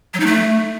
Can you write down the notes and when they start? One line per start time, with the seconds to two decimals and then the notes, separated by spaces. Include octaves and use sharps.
0.14 F#3
0.20 D#4
0.27 A3